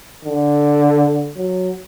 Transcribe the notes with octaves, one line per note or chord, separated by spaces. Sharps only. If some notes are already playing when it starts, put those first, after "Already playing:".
D3
F#3